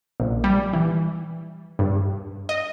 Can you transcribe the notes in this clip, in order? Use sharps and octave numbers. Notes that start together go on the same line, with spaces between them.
A#1
G3
E3
G2
D#5